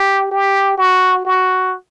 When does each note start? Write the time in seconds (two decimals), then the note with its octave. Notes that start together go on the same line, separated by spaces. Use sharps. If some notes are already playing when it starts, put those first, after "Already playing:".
Already playing: G4
0.31 G4
0.78 F#4
1.25 F#4